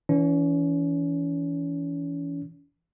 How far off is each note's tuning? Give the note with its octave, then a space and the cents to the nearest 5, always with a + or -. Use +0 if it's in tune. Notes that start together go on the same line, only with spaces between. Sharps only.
E3 +0 C#4 +35